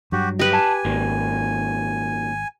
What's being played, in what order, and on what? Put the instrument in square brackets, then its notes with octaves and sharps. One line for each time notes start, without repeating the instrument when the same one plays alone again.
[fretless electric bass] G2 F#3 [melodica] F#4 G4
[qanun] G4 B4 [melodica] D#5
[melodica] G#5 [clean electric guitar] A5
[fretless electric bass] G#1 [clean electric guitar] A#2 D#3 F#3